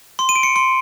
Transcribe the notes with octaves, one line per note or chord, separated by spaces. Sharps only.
C6
D#7
D7
C#7
C6